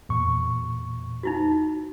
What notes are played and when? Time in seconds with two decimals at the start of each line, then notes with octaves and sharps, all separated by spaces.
0.09 E2 A#2 C#6
1.23 D#4 E4 F#4